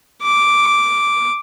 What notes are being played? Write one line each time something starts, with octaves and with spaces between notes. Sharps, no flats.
D6